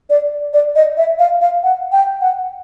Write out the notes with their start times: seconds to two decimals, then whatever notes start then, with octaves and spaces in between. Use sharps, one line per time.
0.10 D5
0.53 D5
0.76 D#5
0.97 E5
1.19 F5
1.41 F5
1.63 F#5
1.92 G5
2.21 F#5